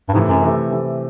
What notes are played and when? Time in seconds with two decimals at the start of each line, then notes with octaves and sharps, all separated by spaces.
0.09 G2
0.13 G#2 C3
0.16 E3 A3
0.28 F#2
0.42 C3 E3 A3
0.71 C3 E3 A3